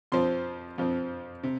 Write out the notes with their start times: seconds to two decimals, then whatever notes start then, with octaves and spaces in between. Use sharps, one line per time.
0.12 F2 F3 C4 C6
0.78 F2 F3 C4
1.43 C3